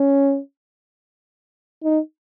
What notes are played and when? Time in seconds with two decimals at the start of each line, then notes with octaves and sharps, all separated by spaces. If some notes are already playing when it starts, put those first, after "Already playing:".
Already playing: C#4
1.84 D#4